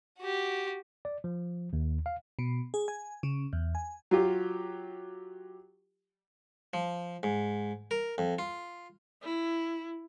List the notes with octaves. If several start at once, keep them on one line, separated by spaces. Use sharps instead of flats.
F#4 G4
D5
F3
D#2
F5
B2
G#4
G#5
C#3
E2
G#5
F#3 F4 G4
F3
G#2
A#4
F2
F4
E4